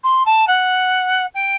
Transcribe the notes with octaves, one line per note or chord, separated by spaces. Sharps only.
C6
A5
F#5
G5